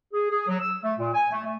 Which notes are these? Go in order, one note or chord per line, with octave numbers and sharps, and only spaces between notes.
G#4
G#4
F#3
E6
A3
A#2
G#5
A3
A3